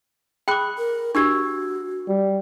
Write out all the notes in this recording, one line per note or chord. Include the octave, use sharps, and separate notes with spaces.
G#4 G5 B5 D6 F#6
A#4
D4 F#4 G4 C#6 E6 G#6
G3